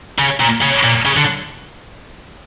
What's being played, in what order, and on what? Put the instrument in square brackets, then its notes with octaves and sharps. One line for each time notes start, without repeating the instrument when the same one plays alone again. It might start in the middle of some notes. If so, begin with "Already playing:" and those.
[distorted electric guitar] C#3
A#2
C#3
A#2
C#3
D3